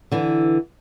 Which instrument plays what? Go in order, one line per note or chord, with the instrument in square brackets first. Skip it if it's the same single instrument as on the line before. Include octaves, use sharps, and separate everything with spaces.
[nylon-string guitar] D3 E3